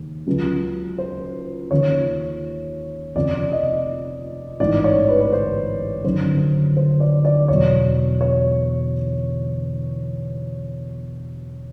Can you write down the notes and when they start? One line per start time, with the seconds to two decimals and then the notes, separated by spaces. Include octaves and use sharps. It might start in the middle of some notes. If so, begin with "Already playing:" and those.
Already playing: D#2 C#3
0.26 C#2 C#3 F#3
0.98 C5
1.71 D#2 C#3 F3 C#5
3.15 F1 F2 C#3 D5
3.52 D#5
4.60 A1 G#2 E3 D5
4.84 C#5
5.09 B4
5.20 B4
5.33 C5
6.04 G1 F#2 D#3 F#3 C5
6.77 C5
7.00 D5
7.25 D5
7.48 E1 E2 B2 F#3 C#5
8.21 C#5